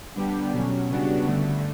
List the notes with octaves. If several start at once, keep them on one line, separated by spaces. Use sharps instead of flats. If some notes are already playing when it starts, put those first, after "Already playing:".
D3 G3 B3 D4 G4
B2 F#3 C#4
C#3 G3 B3 D4 F#4
G2 D3 A3